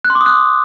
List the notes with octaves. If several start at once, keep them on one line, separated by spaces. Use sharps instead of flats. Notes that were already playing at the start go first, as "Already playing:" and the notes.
F#6
C6
D6
D#6
F#6